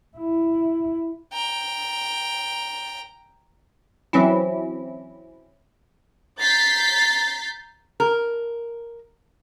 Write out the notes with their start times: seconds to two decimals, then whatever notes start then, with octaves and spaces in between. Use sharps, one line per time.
0.17 E4
1.33 G5 A#5
4.13 E3 F#3 C4 C#4 E4
6.40 A#5 G6 A6 B6 C7
8.00 A#4